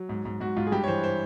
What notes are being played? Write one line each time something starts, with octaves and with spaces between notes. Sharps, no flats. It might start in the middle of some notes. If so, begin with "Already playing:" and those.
Already playing: F#3
G#2
G#2
G#2 F#4
G#2 F4
G#4
G2 G4
C#5
E3 C5
C5